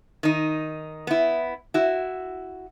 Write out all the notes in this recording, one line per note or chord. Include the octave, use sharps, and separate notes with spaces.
D#3 D#4
B3 E4
E4 F#4